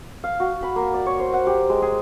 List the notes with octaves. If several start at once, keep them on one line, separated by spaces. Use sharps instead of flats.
F5
F#4
B5
A#3
D5
C#5
C5
F#5
G4
G#3
G#4